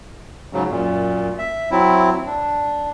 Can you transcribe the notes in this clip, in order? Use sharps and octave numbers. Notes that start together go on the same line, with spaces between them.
G#2 C#3 F#3
F#2 A#2
E5
F#3 C4 E4
D4